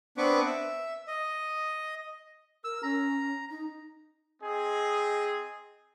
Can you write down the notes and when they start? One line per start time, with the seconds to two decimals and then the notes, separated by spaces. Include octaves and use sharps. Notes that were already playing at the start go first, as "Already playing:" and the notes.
0.17 B3 C4 D4 B4 C#6 D6
0.46 E5
1.08 D#5
2.64 A#4 E6
2.83 C#4 A#5
3.50 D#4
4.43 C4 G#4 D#5